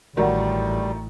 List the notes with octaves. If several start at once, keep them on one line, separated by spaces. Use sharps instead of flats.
A1 D#3 F#3 G3 A3 A#4 D5 F#5